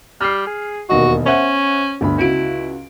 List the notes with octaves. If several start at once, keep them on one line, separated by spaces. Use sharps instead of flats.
G3 F6 C7
G#4
E1 D#2 F#4 D#5
C#4 C5 E5 F#5
G1 D2 B5
C#2 E4 F#4 D7